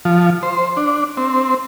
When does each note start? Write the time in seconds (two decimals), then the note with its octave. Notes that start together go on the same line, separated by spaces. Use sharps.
0.05 F3
0.43 C5
0.77 D4
1.17 C4